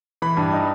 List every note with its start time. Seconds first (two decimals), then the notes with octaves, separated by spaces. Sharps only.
0.22 E3 B5
0.37 G2
0.53 D#4